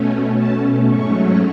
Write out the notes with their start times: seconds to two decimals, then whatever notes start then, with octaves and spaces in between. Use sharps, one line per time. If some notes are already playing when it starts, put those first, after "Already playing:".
Already playing: B2 A3 C#4
0.35 B2 A3 C#4 A5
0.88 G#2 F#3 A3 C#4 C#6